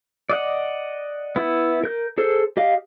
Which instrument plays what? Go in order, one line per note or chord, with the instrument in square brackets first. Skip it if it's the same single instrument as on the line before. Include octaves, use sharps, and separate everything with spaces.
[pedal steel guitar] D5 D#5 F#5
B3 E4
A#4 G6
G#4 A4 C5
G4 D#5 F5